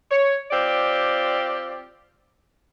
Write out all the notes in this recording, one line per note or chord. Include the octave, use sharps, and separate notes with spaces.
C#5
C4 F4 G4 D5